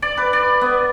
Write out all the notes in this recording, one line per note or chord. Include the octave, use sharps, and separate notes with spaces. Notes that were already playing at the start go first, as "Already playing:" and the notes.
D5
B4
D5
B3